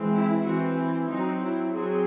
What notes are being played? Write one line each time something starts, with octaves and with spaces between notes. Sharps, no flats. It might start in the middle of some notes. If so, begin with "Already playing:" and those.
Already playing: E3 G#3 C4
E4
E3 C4 F#4
E4
F#3 C4 D#4
E4
F#3 C4 G#4